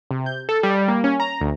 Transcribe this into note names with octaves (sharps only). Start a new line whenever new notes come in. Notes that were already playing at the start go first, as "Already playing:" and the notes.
C3
G6
A4
G3
A#3
C#4
A#5
D2